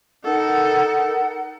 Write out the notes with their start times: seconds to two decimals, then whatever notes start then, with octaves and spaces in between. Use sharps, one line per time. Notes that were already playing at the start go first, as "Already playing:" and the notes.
0.24 D#4 A4 A#4 F#5